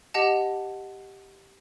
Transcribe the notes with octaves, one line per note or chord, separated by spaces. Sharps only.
G4 D#5 F#5 A5